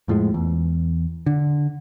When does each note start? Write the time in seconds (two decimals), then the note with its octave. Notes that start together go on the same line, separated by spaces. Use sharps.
0.08 F2 A2 F3 G#3
0.34 E2
1.27 D3